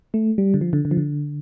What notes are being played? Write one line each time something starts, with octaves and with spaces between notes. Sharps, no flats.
A3
G3
D3
F3
D3
D3
F3
D3